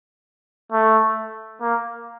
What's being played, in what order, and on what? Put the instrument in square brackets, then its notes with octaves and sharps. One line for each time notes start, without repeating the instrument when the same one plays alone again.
[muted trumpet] A3
A#3